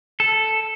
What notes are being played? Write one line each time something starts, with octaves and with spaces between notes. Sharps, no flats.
A4